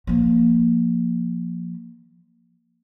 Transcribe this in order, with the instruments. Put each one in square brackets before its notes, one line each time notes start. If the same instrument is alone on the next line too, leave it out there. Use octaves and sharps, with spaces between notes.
[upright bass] F3 A#3